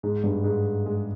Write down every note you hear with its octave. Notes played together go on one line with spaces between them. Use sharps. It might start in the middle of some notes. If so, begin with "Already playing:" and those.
G#2
G2
G#2
G#3